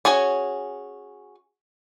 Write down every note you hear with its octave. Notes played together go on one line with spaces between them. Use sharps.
C#4 F#4 G#4 G#5